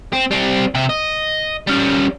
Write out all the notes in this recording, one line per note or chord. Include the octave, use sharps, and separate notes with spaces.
C4
G3 C4
C3 E5
D#5
G3 C#4